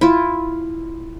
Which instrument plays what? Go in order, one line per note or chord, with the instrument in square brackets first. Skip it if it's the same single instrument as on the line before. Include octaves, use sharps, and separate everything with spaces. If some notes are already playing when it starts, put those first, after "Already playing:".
[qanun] E4 F4